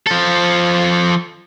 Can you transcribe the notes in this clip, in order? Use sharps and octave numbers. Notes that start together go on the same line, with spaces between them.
F3 A4